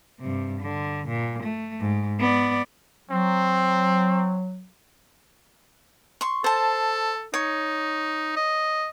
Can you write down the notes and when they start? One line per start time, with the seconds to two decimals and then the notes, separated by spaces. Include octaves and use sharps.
0.20 G2 C3
0.61 D3
1.08 A#2
1.43 A3
1.80 G#2
2.20 B3 D5
3.10 F#3 C4
6.21 C6 C#6
6.44 A4 C5 A5
7.34 D#4 C#5
8.37 D#5